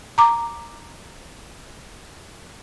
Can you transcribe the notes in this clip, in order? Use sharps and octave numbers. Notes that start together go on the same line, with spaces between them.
A#5 D6